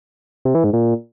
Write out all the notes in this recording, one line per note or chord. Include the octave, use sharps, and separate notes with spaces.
C3
E3
G#2
A#2